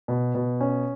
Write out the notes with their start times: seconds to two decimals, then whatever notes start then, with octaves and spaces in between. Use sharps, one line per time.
0.08 B2
0.35 B2
0.61 C#4